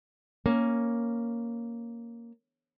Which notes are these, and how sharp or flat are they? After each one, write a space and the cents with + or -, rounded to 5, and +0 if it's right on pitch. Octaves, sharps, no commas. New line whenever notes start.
A#3 +0 C#4 +0